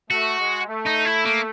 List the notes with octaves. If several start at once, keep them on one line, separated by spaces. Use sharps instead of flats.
A3 F#4
G#3
A3
D#4
E4
A#3